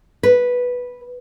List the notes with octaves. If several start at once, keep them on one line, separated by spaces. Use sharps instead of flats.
B4